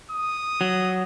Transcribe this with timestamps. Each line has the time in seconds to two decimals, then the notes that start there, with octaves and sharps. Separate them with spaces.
0.11 D#6
0.61 F#3